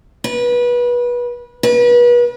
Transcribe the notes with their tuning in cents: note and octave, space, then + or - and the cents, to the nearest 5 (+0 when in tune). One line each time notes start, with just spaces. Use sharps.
B4 -25
B4 -35